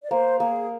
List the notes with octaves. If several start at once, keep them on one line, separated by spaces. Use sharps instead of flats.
D5
A#3 C5
A#3 G#4